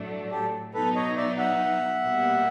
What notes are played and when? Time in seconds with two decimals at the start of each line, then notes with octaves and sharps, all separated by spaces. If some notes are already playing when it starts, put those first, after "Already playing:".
Already playing: A2 F#3 A3 D4
0.31 G4 A4
0.73 B2 F#3 B3 D#4 A4 B4
0.95 C#5 D#5
1.17 D5 E5
1.38 E5 F#5
2.02 B2 G3 A#3